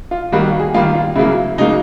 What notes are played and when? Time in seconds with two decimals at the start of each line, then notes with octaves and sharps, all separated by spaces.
0.11 F4
0.32 D#3 G3 A#3 F#4
0.46 F#4
0.60 G#4
0.74 D#3 G3 A#3 F4
0.95 F4
1.16 C#3 F#3 A#3 E4
1.58 C#3 F#3 A#3 D#4